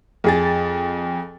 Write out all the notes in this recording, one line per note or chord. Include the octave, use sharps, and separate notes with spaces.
F2 G#4 A6